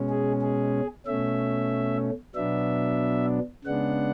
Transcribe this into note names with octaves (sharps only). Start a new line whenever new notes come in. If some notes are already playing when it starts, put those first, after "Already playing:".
Already playing: B2 G#3 C#4
G#4
G#4
B2 A3 C#4 E5
B2 F#3 B3 D4 E5
C#3 G#3 B3 D4 F#5